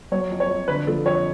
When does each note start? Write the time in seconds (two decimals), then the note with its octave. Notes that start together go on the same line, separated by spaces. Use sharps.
0.11 F#3 C#5
0.31 F2
0.40 C#5
0.49 F2
0.68 D3 B4
0.87 F3 A4
1.05 F2 C#5